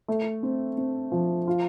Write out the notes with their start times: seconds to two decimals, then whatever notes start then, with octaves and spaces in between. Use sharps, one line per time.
0.08 A3
0.43 C4
0.78 C4
1.12 F3
1.48 F4